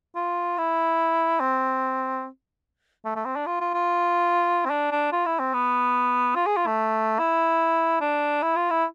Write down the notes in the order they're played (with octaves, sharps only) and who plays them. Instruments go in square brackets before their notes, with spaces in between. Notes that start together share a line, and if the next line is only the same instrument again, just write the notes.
[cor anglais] F4
E4
C4
A3
A3
C4
D4
F4
F4
F4
C4
D4
D4
F4
E4
C4
B3
F4
G#4
F4
A3
E4
D4
E4
F4
E4